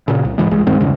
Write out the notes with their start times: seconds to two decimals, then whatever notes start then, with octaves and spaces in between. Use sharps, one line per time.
0.08 A#2 C#3
0.25 C2
0.38 G#2 D3 E3 G#3
0.51 C2 G#3
0.67 G2 D#3 G#3 C4
0.80 E2 G2 C#3